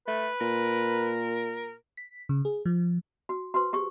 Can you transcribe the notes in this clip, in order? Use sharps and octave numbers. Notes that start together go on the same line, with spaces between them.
A3 B4
A#2 A#4
B6
C#3
G#4
F3
F#4
F#4 B4 C5 C6
G4 G#4 C#6